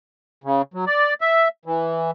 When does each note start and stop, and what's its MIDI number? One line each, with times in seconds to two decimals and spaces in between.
0.44 0.62 49
0.74 0.85 54
0.87 1.14 74
1.21 1.48 76
1.65 2.11 52